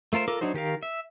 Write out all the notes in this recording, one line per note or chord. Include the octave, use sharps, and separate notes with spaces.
A3 F4 A#4 C5
F4 A4 A#4 D6
F#3 D4 D#4 F#4 C5
D#3 G4 A#4 F5
E5